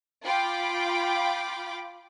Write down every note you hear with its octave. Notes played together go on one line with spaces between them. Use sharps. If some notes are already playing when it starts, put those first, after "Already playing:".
F4 G5 B5 D6